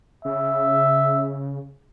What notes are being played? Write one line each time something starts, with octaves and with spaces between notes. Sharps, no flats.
C#3 E5